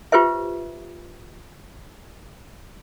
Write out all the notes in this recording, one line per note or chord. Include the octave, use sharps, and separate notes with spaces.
F4 G4 B4 C5 E5